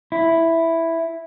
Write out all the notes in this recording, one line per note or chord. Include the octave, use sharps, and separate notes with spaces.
E4